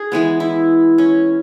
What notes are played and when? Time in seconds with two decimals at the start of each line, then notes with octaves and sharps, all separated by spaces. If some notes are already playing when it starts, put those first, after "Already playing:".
Already playing: G#4
0.12 E3 G#3 B3
0.40 E4
0.98 C#4